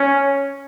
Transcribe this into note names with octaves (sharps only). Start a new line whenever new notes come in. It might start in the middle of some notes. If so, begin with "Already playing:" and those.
Already playing: C#4